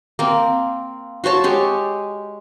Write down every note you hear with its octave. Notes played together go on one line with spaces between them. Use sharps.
A#3 C4
F#4 C5 C#5 A5
G#3 G4 C#5